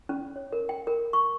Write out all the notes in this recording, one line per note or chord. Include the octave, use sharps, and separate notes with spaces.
C#4
C#5
A#4
G5
A#4
C#6